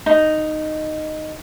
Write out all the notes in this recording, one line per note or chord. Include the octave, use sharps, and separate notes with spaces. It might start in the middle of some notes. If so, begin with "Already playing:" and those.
D#4